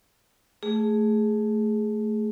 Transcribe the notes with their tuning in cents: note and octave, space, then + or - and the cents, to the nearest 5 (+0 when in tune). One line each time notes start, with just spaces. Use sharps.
A3 +0 G#4 +0